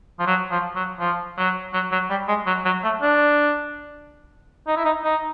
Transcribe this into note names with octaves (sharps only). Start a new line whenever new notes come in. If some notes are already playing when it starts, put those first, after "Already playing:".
F3
F#3
F3
F#3
F3
F#3
F#3
F#3
G3
G#3
F#3
F#3
A3
D4
D#4
E4
D#4
D#4